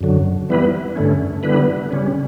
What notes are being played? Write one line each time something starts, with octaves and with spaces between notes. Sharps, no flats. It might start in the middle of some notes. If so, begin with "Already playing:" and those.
F#2 D3 F#3
E3 G3 B3 E4 B4
G2 D3 A3 C#4
D3 G3 B3 E4 B4
C#3 G3 C#4